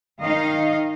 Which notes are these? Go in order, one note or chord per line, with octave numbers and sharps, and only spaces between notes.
D#3 D#4 D#5 F5